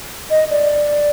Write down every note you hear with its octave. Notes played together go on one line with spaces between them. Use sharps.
D#5
D5